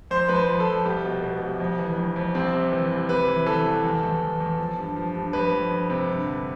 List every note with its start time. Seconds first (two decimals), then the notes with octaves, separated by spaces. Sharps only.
0.11 F2 C5
0.29 F2 B4
0.35 C5
0.48 F3
0.60 A4
0.67 F2
0.85 C2 G4
1.04 B2
1.23 B2
1.41 C2
1.60 F2
1.79 E3
1.98 F2
2.16 F2
2.35 C2 C4
2.53 C3
2.72 E3
2.91 C2
3.09 C3 B4
3.28 E3
3.46 E3 A4
3.65 C2
3.84 E2
4.03 E2
4.21 E2
4.40 E2
4.59 F3
4.78 G2
4.96 F3
5.15 G2
5.33 F2 B4
5.52 F2
5.70 F2
5.90 C3
6.08 G2
6.27 D3